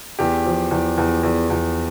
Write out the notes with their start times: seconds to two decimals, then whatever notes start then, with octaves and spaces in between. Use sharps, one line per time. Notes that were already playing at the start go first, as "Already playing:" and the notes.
0.19 E2 G4
0.45 F3
0.71 E2
0.98 E2
1.23 E2
1.50 E2